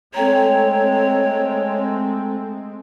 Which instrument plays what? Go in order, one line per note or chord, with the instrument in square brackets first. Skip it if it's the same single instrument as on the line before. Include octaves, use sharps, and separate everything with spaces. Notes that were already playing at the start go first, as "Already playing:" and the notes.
[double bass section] G#3 A3 C4 [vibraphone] A4 G5 A#5 [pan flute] C#5